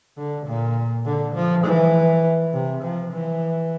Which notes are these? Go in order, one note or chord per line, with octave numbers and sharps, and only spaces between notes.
D3
A#2
D3
F3
E3
C3
F3
E3